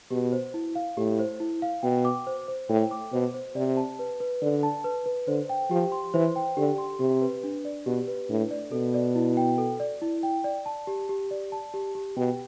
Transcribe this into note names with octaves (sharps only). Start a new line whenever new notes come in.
B2 G4
C5
E4
F5
A2 G4
C5
E4
F5
B2 G5
D6
C5
C5
A2 G5
D6
B2 C5
C5
C3 D5
A5
B4
B4
D3 D5
A5
B4
B4
D3 C5
G5
F3 G4
C6
E3 C5
G5
D3 G4
C6
C3 G4
B4
D4
D5
B2 G4
B4
A2 D4
D5
B2 A4
D5
E4
G5
A4
D5
E4
G5
D5
A5
G4
G4
D5
A5
G4
G4
B2 G5